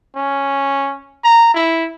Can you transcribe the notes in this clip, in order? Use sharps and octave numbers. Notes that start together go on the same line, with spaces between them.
C#4
A#5
E4